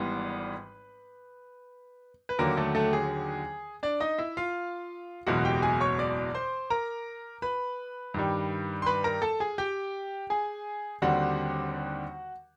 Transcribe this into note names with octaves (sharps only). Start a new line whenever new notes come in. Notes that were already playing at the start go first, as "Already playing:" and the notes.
Already playing: G#1 G#2 E3 G3 B3 B4
B4
D#2 D3 F#3 A#3 A#4
A3 A4
A3 A4
G#4
D4 D5
D#4 D#5
E4 E5
F4 F5
F#1 E2 B2 G#3 F#4 F#5
G4 G5
G#4 G#5
C#5 C#6
D5 D6
C5 C6
A#4 A#5
B4 B5
G2 D#3 G3
C6
B4 B5
A#4 A#5
A4 A5
G#4 G#5
G4 G5
G#4 G#5
D#2 D3 G3 C4 F#4 F#5